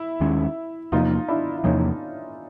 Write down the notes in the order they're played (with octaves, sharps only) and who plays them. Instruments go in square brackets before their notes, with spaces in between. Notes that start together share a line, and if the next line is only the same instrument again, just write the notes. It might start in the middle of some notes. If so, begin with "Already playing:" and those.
Already playing: [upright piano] E4
[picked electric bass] D#2 D#3 G#3 C#4
[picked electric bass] E2 C3 F3 A#3 [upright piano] D#4 F4
[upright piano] D4 E4
E4
[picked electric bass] E2 C3 F3 A#3 [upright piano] C#4 D#4